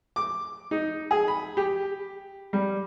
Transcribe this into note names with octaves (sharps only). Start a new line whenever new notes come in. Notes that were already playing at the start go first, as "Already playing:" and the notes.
D6
D#4
G#4
B5
G4
G3